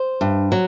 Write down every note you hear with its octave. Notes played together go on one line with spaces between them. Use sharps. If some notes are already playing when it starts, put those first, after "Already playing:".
Already playing: C5
G2
F#3